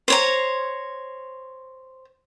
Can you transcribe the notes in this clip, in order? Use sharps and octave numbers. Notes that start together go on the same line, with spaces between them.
C5 C#5 A#5